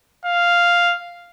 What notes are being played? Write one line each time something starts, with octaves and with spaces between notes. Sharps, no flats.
F5